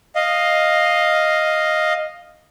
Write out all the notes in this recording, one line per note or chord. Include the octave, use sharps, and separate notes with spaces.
D#5 F5